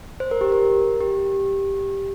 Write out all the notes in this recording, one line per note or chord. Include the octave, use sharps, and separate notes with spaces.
C5
A#4
G4
A#4
G4